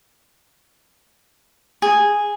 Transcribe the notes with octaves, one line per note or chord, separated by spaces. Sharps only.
G#4